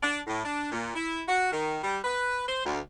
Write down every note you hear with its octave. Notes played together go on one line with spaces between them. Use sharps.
D4
A2
D4
A#2
E4
F#4
D#3
G3
B4
C5
D2